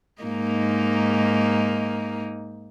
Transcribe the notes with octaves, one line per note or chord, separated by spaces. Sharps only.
G#2 A#3 D#4